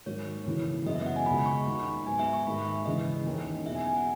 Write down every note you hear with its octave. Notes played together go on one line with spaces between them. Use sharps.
G#2 D#3 F#3 A#3 C#5
D#2 C#3 E3 A#3 E4
F#2 C#3 G#3 B3 D#5
E5
F#5
G#5
C#2 B2 F#3 B5
C#6
D#2 D#3 A#3 D#4 B5
G#2 F#3 B3 G#5
E5
C#6
G#2 D#3 A#3 D#4 B5
E5
C#3 E3 G#3 C#4 D#5
D#2 D#3 G#3 C#4
E2 B2 F#3 E5
G#5
G#5
F#5